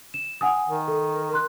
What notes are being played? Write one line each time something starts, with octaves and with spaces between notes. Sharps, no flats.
E7
F#5 G#5 D#6
D#3
A4
C6 F#6